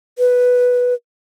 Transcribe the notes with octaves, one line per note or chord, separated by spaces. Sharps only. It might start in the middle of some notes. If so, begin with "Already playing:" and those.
B4